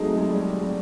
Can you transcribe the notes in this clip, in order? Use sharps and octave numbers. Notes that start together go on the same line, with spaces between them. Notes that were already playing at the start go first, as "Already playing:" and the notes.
Already playing: F#3 G#3 A3 C4 D#4
G#3
G3
G#3
G3